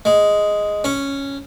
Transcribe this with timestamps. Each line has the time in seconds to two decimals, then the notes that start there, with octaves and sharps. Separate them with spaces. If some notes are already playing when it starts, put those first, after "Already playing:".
0.05 G#3
0.84 C#4